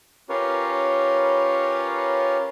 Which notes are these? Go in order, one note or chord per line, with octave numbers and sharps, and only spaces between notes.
C#4 F4 G4 A#4 B4 C#5